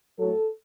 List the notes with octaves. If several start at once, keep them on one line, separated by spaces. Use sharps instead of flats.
A2 F#3 A4